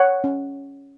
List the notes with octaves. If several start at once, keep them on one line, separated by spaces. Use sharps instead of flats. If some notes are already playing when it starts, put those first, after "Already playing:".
Already playing: C#5 F#5
C#4